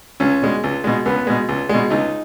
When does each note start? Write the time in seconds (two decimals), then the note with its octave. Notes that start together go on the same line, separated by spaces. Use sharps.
0.20 C#2 C#4
0.42 B2 G#3
0.64 C#2
0.84 B2 G#3
1.06 C#2 B3
1.27 B2 G#3
1.49 C#2
1.69 B2 G#3
1.91 C#2 D#4